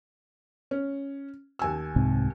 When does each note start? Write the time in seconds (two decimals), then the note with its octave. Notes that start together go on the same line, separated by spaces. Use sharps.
0.71 C#4
1.59 D#2 G#5 E6
1.96 C2 G#2 C3